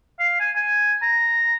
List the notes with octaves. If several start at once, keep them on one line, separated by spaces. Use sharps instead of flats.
F5
G#5
G#5
A#5